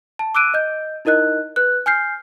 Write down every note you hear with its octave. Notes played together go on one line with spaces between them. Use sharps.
A5
D6 E6 F#6 D7 D#7
D#5 G6
D#4 E4 A#4 D#5 F#6
B4 F#6
G#5 F6 G6 C7